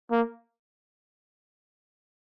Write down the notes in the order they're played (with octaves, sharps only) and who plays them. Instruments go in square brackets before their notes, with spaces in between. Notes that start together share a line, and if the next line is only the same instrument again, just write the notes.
[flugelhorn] A#3